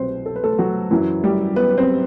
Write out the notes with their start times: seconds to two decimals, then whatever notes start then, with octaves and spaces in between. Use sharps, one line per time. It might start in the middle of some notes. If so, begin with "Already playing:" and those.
Already playing: C2 B2 F#3 C4 B4 C5
0.26 A4
0.36 B4
0.44 A3 A4
0.59 F#3 F#4
0.91 F#2 E3 F#3 E4
1.24 G3 G4
1.56 B3 B4
1.70 B4
1.78 C4 C5